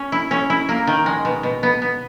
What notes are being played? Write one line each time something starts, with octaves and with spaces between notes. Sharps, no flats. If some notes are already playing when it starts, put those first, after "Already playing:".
Already playing: C#4
E4
C#4
E4
A#3
D#3
G#3
B2
B2
B3
B3